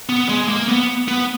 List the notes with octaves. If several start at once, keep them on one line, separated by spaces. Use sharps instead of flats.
B3
G#3
A#3
B3
B3